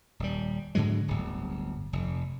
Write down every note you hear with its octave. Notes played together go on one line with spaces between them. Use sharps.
D#1 G3
G#2 D3 F#3 G#3
D1 G1
F1